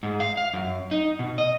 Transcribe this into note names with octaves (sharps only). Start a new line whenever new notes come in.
G#2
F5
F5
F#2
D#4
B2
D#5